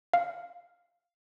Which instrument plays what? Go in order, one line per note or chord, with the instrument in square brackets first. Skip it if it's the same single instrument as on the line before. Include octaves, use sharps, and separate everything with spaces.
[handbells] F5